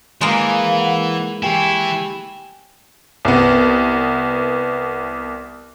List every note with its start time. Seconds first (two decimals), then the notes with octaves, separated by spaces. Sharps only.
0.21 E3 G#3 A#3
0.81 F#5
1.43 E3 E4 G4 G5 G#5
3.25 C2 B3